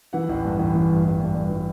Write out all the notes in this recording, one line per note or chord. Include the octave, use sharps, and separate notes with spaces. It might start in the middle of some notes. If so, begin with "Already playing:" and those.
E3 F#5
A1
G2
A1
A1
G2
A1
G2
G2
E3